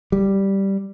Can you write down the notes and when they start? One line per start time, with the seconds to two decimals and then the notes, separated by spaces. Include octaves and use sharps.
0.12 G3